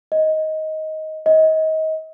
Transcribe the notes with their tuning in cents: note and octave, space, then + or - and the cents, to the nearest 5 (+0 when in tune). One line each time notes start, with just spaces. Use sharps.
D#5 +15
D#5 +30